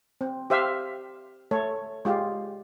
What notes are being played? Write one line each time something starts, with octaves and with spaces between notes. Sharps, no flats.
C4
G4 C5 E5 F5
A3 A4 C#5
G#3 F4 G4